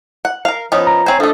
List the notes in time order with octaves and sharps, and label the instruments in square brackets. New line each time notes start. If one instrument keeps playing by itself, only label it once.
[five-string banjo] F#5
A#4 F5
[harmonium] F3 [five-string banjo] B3 C#4 D#4
[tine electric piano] A#5
[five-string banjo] C4 C5 [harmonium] C#5 G#5
[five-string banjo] F3 A3 [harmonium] D4 A4 D#5